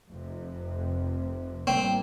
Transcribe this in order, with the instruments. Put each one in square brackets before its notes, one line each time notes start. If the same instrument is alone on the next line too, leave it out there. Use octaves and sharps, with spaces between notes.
[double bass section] F1 F2 C3
[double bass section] A1 A2 G3 A#3 [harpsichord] C4